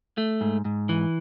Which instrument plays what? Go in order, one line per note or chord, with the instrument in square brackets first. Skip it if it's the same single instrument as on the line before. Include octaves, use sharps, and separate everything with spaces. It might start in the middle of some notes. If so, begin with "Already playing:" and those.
[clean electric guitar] A3
G#2
G#2
E3